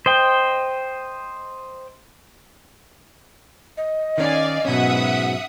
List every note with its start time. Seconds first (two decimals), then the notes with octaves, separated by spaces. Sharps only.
0.06 C5 D#5 G5
3.77 D#5
4.18 D#3 C#4 D5 F5 G#5
4.65 G#2 B2 F#3 B3 C#4 E5 F#5 D#6